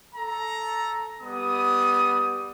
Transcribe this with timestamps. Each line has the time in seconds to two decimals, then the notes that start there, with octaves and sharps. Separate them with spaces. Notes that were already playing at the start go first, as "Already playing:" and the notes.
0.15 A4 A#5
1.22 G3 B3 D#6